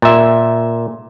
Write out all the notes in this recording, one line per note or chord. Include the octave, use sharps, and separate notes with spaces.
A#2 E5